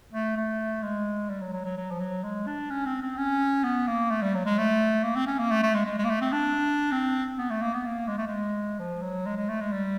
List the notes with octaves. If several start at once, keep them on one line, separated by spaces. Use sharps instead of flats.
A3
A3
G#3
G3
F#3
F#3
F#3
F#3
F3
F#3
G#3
D4
C#4
C4
C4
C#4
B3
A#3
A3
G3
F#3
G#3
A3
A#3
C4
C#4
A#3
A3
A3
G#3
G#3
G#3
A#3
A3
C4
D4
C4
B3
A3
A#3
B3
A#3
G#3
A3
G#3
F3
F#3
G#3
G#3
A3
G#3
G3